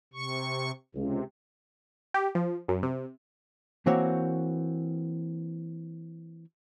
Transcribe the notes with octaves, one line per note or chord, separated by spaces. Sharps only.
C3 C#6
C#2 C3
G4
F3
F#2
C3
E3 A#3 C4 F#4 C#5